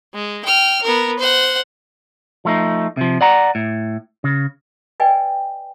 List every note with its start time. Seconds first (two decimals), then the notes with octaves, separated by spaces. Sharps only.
0.15 G#3
0.45 G5 F6
0.83 B3 A#4
1.19 C5 F#5
2.45 F3 A3 D#4
2.97 C3 F3
3.21 D5 F#5 A#5
3.55 A2
4.24 C#3
5.00 B4 D5 D#5 G5 G#5